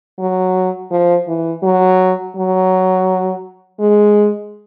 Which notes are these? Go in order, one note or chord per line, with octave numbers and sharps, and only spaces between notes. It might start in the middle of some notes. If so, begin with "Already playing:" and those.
F#3
F3
E3
F#3
F#3
G#3